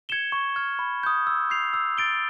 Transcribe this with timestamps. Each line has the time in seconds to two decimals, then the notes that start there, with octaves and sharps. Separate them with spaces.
0.09 G#6 C#7 E7 G7
0.32 C#6
0.56 F6 G#6
0.79 B5
1.03 D#6 G6
1.27 E6
1.50 G6 C7 F7
1.74 E6
1.98 A6 D7 G7